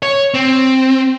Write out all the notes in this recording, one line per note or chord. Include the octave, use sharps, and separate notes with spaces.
C#5
C4